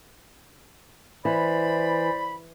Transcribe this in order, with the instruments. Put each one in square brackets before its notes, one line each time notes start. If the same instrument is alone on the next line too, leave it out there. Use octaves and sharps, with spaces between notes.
[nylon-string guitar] E3 [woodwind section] C5 D5 B5